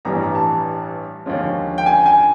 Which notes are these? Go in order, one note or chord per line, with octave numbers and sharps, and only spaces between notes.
A1 G2 E3 G3 A#5
A#5
A5
D#2 D3 F3 G#3 C#4
G5
G#5
G#5